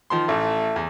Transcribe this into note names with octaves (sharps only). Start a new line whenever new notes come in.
D#3 F3 C6
A1 A3
E2